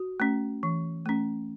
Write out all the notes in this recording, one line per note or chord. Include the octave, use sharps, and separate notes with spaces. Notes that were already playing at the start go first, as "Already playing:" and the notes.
Already playing: F#4
A3 C#4
E3
A3 C#4